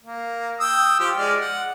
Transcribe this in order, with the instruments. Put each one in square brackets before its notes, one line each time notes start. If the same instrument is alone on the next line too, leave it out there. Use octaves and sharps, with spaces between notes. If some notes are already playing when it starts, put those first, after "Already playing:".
[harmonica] A#3
G5 D#6 E6
F3 F4 G4
G#3 D5 F6
F#5